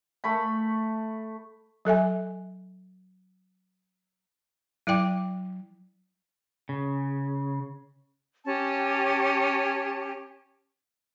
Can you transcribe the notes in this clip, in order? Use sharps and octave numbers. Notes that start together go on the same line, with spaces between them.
A3 B5
F#3 A4 E5 G#5
F#3 E4 D5 G5 D6
C#3
C#4 G4 A5